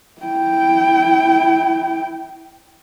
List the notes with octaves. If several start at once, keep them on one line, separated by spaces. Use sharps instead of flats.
E4 G5